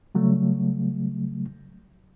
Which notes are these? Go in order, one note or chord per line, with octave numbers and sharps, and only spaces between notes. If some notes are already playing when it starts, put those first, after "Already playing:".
C#3 F#3 G3 A3